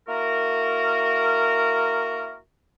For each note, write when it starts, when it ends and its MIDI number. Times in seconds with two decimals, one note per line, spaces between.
0.07 2.37 58
0.07 2.37 64
0.07 2.37 66
0.07 2.37 70